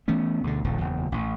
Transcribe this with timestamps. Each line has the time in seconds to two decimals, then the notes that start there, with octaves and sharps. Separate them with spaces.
0.08 E3 A3 B3 C#4
0.44 D2 B2 D3
0.64 D#1 A#1 D#2 D3
0.78 F#1 E2
1.12 A1